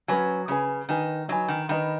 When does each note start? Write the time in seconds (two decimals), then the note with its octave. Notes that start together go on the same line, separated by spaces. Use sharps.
0.08 F#3 C#4 G#4 B4 G#5
0.48 C#3 C#4 G#4 B4 G#5
0.89 D#3 D#4 B4 G#5
1.28 F#3 D#4 B4 G#5
1.48 D#3
1.69 D#3 B4 D#5 G#5 B5